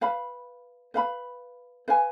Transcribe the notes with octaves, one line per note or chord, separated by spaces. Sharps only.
B4 F5 B5
B4 F5 B5
B4 F5 G#5